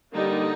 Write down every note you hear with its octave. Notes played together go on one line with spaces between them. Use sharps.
D3 G3 A#3 D#4